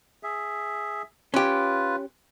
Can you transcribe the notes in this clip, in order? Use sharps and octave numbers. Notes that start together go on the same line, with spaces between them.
G#4 E5
C#4 F4 G4 B4